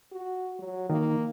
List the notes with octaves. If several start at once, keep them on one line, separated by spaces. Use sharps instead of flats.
F#4
F#3
D#3 A#3